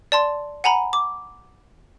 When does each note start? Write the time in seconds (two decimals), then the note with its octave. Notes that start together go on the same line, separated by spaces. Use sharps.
0.12 D5 A5 C6
0.64 F#5 G#5 A#5 B5
0.93 D6